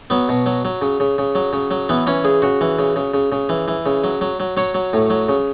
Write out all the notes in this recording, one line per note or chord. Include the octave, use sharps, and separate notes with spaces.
F#3 B3
B2
F#3
F#3
C#3
C#3
C#3
F#3
C#3
F#3
E3 B3
E3 C#4
C#3 G#4
C#3 F#4
E3
C#3
C#3
C#3
C#3
E3
E3
C#3
F#3
F#3
F#3
F#3 C#5
F#3
A2
F#3
C#3